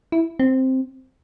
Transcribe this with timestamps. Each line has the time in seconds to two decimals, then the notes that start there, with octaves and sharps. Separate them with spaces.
0.12 E4
0.40 C4